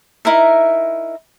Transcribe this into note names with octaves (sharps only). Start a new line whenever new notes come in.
D#4 E4 A#4 E5